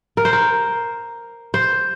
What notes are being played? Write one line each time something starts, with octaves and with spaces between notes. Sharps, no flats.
A#4
C5
A#4
C5